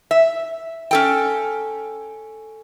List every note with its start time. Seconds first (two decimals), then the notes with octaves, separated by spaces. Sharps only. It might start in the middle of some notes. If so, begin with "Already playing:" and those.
0.11 E5
0.91 C#4 A4 G5